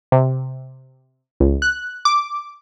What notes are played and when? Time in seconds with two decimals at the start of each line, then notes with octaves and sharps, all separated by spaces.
0.12 C3
1.40 C#2
1.62 F#6
2.05 D6